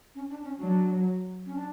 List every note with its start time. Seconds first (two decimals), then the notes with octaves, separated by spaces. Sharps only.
0.15 C#4
0.30 D4
0.43 C#4
0.58 F#3 D4
1.46 C#4
1.55 D4